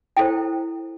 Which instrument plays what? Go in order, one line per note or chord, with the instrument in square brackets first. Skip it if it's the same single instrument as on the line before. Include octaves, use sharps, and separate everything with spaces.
[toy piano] E4 A4 C5 G5